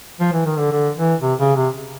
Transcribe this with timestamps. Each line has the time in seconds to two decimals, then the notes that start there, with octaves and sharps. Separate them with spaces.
0.20 F3
0.33 E3
0.46 D#3
0.58 D3
0.71 D3
0.97 E3
1.22 C3
1.39 C#3
1.56 C3